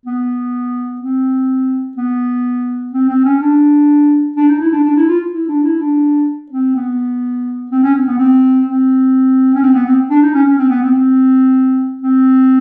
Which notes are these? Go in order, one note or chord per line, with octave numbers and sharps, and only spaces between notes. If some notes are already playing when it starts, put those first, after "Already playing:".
B3
C4
B3
C4
C4
C#4
D4
D4
D#4
E4
D4
D4
E4
F4
E4
D4
E4
D4
C4
B3
C4
C#4
C4
B3
C4
C4
C#4
C4
B3
C4
D4
D#4
C#4
C#4
C4
B3
C4
C4
C4